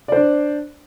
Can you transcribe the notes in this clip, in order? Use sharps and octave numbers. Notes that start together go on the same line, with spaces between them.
D4 C5 D5